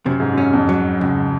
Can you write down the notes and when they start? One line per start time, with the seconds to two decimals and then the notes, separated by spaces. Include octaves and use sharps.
0.06 F#2 C3
0.20 G#2
0.33 F#2 C#4
0.53 F2
0.69 F#3
1.00 C#2 F#2